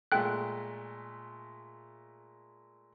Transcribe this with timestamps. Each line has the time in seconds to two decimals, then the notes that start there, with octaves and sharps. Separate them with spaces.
0.12 A#2 G#3 A3 G5 F#6